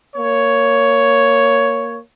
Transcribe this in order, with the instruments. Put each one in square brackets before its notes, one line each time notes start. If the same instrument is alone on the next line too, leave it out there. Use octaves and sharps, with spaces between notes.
[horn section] A#3 C#5